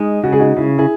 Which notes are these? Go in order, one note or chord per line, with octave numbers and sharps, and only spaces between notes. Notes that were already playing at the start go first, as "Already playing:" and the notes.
Already playing: G#3 D#4
C#3 F#4
G#4
D#4 F#4
C#3 E4
E4 G#4